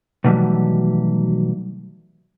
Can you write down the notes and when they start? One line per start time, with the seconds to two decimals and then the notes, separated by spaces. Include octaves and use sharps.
0.24 B2 D#3 E3 F#3 G3 A3